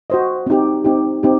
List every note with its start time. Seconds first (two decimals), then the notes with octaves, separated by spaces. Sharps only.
0.10 F#4 C5 D#5
0.47 C4 D#4 G4
0.85 C4 D#4 G4
1.23 C4 D#4 G4